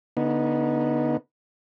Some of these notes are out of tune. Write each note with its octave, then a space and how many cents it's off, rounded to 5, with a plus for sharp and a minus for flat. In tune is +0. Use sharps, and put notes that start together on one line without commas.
D3 -25 B3 -20 D#4 +0